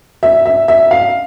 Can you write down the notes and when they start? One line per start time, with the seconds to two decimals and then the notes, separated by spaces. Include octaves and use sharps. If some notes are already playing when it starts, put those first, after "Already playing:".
0.23 E5
0.46 E5
0.68 E5
0.91 F5